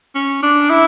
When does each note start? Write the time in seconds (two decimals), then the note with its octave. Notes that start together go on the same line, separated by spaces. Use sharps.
0.15 C#4
0.42 D4
0.70 E4